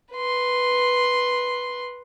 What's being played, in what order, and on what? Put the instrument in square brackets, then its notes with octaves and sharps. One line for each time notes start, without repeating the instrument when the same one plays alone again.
[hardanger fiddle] B4 C6